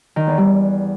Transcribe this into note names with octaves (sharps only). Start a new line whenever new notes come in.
D#3
E2
G3